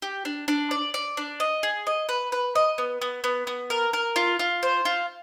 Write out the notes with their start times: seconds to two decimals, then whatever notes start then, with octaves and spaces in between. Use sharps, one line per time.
0.02 G4
0.25 D4
0.48 D4
0.71 D5
0.94 D5
1.17 D4
1.40 D#5
1.63 G#4
1.87 D#5
2.09 B4
2.32 B4
2.55 D#5
2.78 B3
3.02 B3
3.24 B3
3.47 B3
3.70 A#4
3.93 A#4
4.16 F4
4.39 F4
4.63 C5
4.85 F4